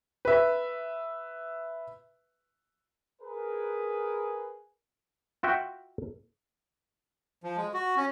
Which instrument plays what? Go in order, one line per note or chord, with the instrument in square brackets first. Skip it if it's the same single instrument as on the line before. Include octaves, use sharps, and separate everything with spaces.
[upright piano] B4 E5
[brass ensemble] G#4 A#4 B4
[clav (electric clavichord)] F4 F#4 E5 G5
[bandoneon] F3
G#3
F#4
C#4